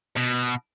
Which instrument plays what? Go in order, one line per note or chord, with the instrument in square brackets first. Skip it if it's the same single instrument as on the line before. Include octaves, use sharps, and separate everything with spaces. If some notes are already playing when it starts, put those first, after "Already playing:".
[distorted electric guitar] B2